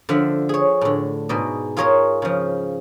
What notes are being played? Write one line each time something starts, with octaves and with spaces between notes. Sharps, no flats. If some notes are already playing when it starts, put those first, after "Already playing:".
D3 F3 D4 E5 F#5
G#4 C#5
A2 D3
G#2 B2 D5 D#5
F4 G#4 A#4 C#5 D#5 A#5
C#3 F3